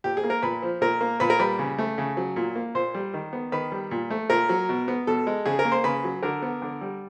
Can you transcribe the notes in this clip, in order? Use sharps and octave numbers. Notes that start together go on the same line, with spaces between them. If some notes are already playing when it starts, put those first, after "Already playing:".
A#2 G4
G#4
A#3
A#4
A#2 B4
F3
A#2 A#4
A#3
A#2 B4
A#4
G3 B4
C#3
A3
C#3
F#3
A#2
A#3
A#2 C5
G3
D#3
B3
D#3 B4
G3
A#2
A3
A#2 A#4
F#3
B2
B3
B2 A4
G#3
C#3 G#4
A#4
A#3
C5
C#3 B4
F#3
D3 A#4
B3
D3
G3